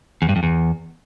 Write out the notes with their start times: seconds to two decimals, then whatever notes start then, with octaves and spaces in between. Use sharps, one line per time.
0.22 E2
0.29 G2
0.36 F2
0.43 E2